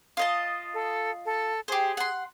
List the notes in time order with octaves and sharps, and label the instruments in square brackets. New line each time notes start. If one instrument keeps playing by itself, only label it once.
[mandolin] F4 D#5 A5
[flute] A4
A4
[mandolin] G4 C5 [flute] G#4
[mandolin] F#5 C6